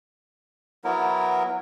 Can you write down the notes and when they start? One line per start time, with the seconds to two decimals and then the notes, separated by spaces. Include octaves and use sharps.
0.84 F#3 B3 E4 A#4